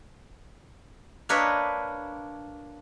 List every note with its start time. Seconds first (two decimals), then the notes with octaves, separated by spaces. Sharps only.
1.29 A#3 D4 B4 C#5 D#5